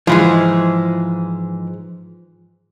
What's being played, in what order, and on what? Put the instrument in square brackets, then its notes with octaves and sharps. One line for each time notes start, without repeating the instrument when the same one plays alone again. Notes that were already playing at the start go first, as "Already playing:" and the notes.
[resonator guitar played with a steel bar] G#2 E3 G#3 [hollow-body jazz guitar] F3